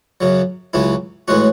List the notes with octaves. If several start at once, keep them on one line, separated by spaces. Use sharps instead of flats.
F#2 C#3 F#3
C#2 C#3 F#3 C#4 E4
A2 E3 G#3 C#4 F#4